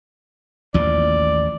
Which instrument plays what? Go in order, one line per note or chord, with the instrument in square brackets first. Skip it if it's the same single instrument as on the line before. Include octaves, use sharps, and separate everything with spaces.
[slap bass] A1 D#2 F3 [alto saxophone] D5